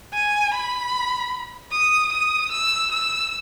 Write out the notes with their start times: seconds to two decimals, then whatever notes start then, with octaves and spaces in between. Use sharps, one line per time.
0.13 G#5
0.53 B5
1.72 D#6
2.12 D#6
2.51 E6
2.91 E6